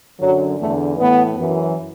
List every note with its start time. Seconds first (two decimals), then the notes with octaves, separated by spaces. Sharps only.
0.20 F#2 D3 F#3
0.59 E2 D3 A3
0.98 A2 E3 B3
1.37 F#2 E3